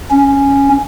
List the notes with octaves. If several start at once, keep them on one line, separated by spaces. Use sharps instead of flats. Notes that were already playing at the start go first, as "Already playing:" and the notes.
C#4